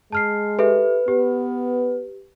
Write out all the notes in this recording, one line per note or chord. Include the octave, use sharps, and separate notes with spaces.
G#3 A5 F6 C7
G4 A4 B4 E5
B3 G4